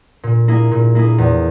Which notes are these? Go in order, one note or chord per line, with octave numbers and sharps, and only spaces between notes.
A#2
A#3 E4 G#4
A#2
A#3 E4 G#4
E2